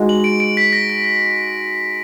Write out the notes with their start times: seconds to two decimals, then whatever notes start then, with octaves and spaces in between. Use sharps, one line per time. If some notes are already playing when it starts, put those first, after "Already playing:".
Already playing: G#3 D#4 F#4
0.09 F#7
0.24 D7
0.40 D7
0.57 B6
0.73 A#6
0.90 A#6
1.04 A#6